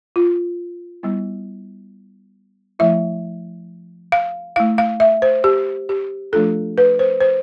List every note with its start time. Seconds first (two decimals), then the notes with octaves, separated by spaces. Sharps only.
0.16 F4
1.03 G3 B3 E4
2.79 F3 A3 E4 E5
4.12 F5
4.56 A3 E4 F5
4.78 F5
5.00 E5
5.22 C5
5.44 G4
5.89 G4
6.33 F3 A3 D4 F4 A4
6.78 B4
6.99 C5
7.21 C5